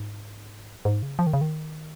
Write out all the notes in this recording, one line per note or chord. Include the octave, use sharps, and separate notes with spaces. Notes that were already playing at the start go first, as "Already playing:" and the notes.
Already playing: G#2
G#2
C#3
F3
D#3
C#3
D#3